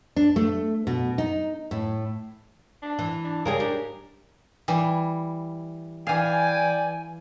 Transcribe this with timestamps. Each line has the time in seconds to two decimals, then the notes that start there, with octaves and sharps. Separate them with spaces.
0.16 D4
0.36 A3
0.87 B2
1.18 D#4
1.71 A2
2.82 D4
2.99 E3
3.24 D4
3.45 C#3 G3 G#4 A#4
3.60 D4 G4
4.68 E3 G3
6.07 E3 D5 F5 G5 G#5